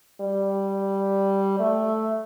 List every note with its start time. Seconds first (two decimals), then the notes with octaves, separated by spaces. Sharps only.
0.21 G3
1.60 A3